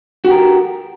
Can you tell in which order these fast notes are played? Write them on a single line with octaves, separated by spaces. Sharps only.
F#4 G4 A#4